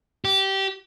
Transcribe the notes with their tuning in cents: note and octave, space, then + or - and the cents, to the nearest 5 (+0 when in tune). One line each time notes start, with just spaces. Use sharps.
G4 -20